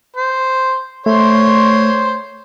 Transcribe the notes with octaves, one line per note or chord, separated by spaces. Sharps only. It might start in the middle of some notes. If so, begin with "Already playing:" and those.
C5
A3 C5 C#5 C6